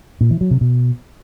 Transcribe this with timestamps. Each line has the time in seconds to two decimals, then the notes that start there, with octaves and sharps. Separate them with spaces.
0.21 A#2
0.31 E3
0.41 F#3
0.51 C3
0.61 B2